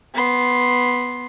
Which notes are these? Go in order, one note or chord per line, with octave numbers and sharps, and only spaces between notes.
B3 C6